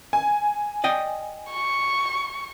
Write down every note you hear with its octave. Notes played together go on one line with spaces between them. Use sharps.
G#5
D5 D#5 G5
C#6